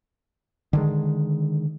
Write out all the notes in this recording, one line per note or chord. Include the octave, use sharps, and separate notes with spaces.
D3 D#3 G#3